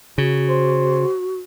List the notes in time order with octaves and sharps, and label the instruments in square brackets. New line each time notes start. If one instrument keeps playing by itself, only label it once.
[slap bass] C#3 [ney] F#4
[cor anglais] C5